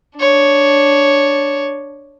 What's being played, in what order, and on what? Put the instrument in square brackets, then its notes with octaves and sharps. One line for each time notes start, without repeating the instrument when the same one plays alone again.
[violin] D4 C#5